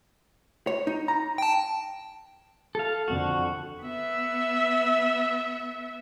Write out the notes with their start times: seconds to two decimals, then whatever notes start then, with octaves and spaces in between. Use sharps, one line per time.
0.67 C#5
0.87 D#4
1.08 A#5
1.38 G5 A5
2.75 A4 F5
3.08 F2 D3 F#4
3.83 B3 E5